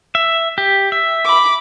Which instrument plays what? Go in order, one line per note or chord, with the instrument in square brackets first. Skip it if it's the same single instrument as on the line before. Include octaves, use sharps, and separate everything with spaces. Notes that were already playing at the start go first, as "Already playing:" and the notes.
[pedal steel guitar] E5
G4
E5
[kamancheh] B5 D6